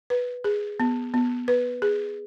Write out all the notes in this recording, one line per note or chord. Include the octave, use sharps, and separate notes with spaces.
B4
G#4
B3
B3
B4
G#4